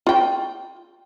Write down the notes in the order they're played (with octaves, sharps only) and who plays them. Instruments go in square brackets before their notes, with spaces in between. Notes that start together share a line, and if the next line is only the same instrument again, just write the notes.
[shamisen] F4 G5